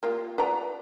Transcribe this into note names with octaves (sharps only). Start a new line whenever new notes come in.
A#3 F4 G4
B4 D5 A#5